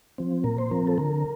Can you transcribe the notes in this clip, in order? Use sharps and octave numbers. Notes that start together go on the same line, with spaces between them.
F3 C4
A#2 A#4
C5
F3 C4 A#4
A4
D3 A#4